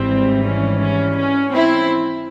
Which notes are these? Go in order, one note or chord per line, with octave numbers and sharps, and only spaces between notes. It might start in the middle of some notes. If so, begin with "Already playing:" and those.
Already playing: G#1 G#2 E3 G3 C4
C#4
C#4
C#4
C4 E4